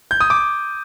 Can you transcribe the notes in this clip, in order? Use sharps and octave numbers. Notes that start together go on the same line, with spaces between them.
G6
D#6
D6